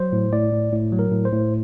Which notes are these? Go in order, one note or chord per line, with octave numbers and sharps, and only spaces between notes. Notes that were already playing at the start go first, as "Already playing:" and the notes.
Already playing: F#3 C5
A2
A2 D5
A2
A2
F#3
A#4
A2
C5
A2